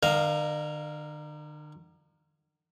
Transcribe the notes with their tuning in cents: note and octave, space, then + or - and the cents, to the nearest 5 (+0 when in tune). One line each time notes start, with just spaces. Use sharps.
D3 +45 A#4 +0 F5 +0